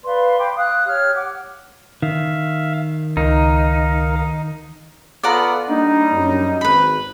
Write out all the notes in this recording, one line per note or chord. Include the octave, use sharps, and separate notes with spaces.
B4 D5 F5 C6
G5 B5 C6 D6
F5 D#6 F#6
G4 C#5 F6
F#5 D6
D#3 E5 F5
C#2 D#4 A#4 F5
B3 F4 A4 D5 F#5 A#5
G3 A#3 D4 D#4
F#2
G#1 B4 B5